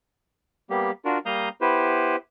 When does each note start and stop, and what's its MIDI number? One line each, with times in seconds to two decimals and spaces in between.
0.70 0.91 55
0.70 0.91 58
0.70 0.91 59
0.70 0.91 67
1.05 1.18 62
1.05 1.18 65
1.05 1.18 66
1.05 1.18 70
1.26 1.49 55
1.26 1.49 58
1.26 1.49 77
1.26 1.49 82
1.26 1.49 87
1.26 1.49 91
1.61 2.16 59
1.61 2.16 64
1.61 2.16 67
1.61 2.16 71
1.61 2.16 72